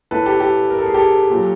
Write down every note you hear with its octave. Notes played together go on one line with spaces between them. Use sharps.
A2 E3 A4 B4
G4 A4
G4 A4
A#4
A4
G#4
G4 A4
A#2 F#3